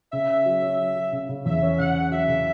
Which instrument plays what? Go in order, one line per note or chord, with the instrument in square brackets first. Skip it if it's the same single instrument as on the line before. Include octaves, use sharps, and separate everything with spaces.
[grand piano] C#3 [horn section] E5
[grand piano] C#4
F#3
C#4
F#3
F#3
C#3
C#3
[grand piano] E2 [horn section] E5
[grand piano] C#4
[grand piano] C#3 [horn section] F#5
[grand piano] C#4
[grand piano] F#3 [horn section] E5
[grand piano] C#3